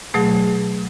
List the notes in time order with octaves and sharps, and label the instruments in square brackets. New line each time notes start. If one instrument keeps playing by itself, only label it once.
[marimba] B2 F#3 A3 G#4